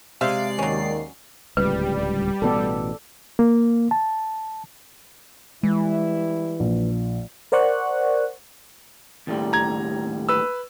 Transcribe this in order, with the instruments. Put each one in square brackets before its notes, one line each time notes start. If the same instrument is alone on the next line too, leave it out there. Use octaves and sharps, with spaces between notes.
[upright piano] C3 [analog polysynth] G#3 D5 C7 [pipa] C5 E5 F5
[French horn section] D#2 D#3 [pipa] F#3 C#4
[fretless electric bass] D1 C#2 [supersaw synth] G3 [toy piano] B4
[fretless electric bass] A1 B2 B3 [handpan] A4 D5
[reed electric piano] A#3
A5
[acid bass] E3 [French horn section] G3 E4 [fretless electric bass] G#3
[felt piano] A#1
[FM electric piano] A#4 C5 D5 F#5 C#6 F#6
[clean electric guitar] D#2 A2 G3
[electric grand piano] A#5 G#6
B4 E6